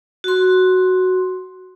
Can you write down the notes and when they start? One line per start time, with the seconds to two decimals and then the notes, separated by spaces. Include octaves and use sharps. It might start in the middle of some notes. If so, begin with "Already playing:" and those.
0.24 F#4 C6